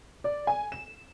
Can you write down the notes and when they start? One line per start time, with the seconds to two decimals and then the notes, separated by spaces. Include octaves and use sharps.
0.24 D5
0.47 G#5
0.72 E7